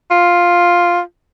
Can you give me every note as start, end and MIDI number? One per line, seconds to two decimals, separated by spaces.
0.11 1.00 65